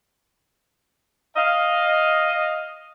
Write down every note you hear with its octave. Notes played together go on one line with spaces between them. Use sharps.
D#5 F5